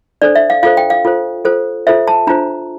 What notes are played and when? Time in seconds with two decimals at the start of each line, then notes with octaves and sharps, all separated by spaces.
0.22 D4 A4 C5 D5
0.35 E5
0.50 F5
0.63 F4 A4 C5 F5
0.77 G5
0.90 F5
1.05 F4 A4 C5
1.45 F4 A4 C5
1.87 F4 A4 C5 E5
2.08 A5
2.27 D4 F4 C5 A#5